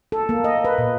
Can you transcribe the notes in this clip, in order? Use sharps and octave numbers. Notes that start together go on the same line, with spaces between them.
A4
A#3
D#5
B4
A#2